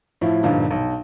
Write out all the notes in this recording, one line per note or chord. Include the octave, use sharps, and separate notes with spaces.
A2 F3 E4
G2 A#2 D3 F3 D#4
B1